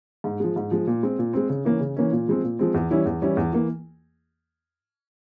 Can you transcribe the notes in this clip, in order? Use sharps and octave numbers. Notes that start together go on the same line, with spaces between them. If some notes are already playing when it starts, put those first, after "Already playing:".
G#2
F3 G#3
G#2
F3 G#3
A#2
G#3 C4
A#2
G#3 C4
C#3
E3 A#3 C#4
C#3
E3 A#3 C#4
A#2
F3 G#3 C4
A#2
F3 G#3 C4
E2
E3 G3 C#4 E4
E2
E3 G3 C#4 E4
E2
E3 A#3